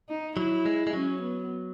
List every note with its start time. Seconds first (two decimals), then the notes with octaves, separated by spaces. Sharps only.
0.09 D#4
0.37 F#3 E4
0.66 G#3
0.87 G#3
0.93 F#3 C#4
1.22 B3